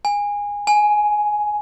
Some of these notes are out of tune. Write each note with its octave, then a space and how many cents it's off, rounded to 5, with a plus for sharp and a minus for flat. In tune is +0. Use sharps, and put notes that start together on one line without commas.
G#5 -20
G#5 +10